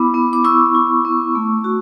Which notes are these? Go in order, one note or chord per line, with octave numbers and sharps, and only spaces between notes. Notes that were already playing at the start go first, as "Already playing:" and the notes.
Already playing: B3 E4 B5 D6
B3
D6
E4 C#6 E6
E4
B3
A3
F#4